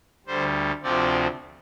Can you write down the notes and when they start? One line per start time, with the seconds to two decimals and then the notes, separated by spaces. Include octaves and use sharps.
0.26 D2 D3 G3 C5
0.83 D2 C3 F3 C4 D5